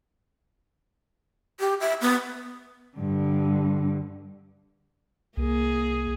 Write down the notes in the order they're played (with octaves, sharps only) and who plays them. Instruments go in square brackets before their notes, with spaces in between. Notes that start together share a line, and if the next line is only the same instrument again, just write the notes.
[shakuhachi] G4
E5
B3
[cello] G2 D3
[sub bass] C2 [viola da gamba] A#3 G#4